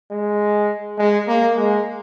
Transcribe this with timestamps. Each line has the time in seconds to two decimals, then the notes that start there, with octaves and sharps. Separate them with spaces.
0.11 G#3
0.98 G#3
1.28 A#3
1.57 G#3